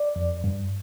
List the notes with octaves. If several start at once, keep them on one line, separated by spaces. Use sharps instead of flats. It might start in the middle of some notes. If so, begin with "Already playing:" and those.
Already playing: D5
F2
G2